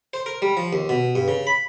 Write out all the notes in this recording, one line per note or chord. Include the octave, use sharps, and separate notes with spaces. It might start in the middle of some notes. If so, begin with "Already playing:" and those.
C5
A#4
G3
F3
D#2
B2
G2
C#3
B5